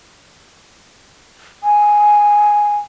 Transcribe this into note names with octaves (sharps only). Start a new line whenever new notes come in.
G#5